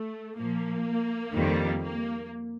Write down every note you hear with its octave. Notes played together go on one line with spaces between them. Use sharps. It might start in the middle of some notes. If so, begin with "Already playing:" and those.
Already playing: A3
A#2 F3 A#3
F2 D#3 G3
A#3